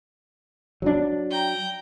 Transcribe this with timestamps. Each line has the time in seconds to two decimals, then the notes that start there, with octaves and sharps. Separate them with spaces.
0.82 F#3 C#4 D4
1.31 G5 A#5